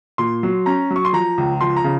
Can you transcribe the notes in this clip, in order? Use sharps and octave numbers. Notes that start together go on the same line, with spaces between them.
A#2 C6
F#3
C#4 A#5
F#3
C#6
C6
F3 A#5
C#2
F3 C6
A#5
C#3